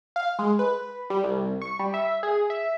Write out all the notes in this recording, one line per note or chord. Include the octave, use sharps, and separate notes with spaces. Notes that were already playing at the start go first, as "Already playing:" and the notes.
F5
G#3
B4
G3
C2
C#6
G3
E5
G#4
E5